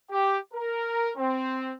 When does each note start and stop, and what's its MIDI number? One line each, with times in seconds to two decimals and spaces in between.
0.10 0.37 67
0.54 1.12 70
1.17 1.73 60